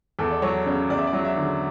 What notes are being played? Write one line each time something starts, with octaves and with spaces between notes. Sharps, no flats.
E2 A4
D5
F#3 C#5
C#3 D5
E2 D5
E5
D5
F#3
E5
D3